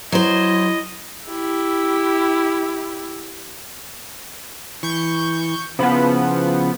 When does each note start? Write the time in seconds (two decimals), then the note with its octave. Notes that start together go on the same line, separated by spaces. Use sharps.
0.12 F#3 E4 C5 D#5
1.28 E4 G4
4.83 E3 C#6 G6
5.79 C#3 F3 B3 E4 B5